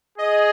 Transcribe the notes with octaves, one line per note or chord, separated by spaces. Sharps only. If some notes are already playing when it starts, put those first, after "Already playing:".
G#4 D#5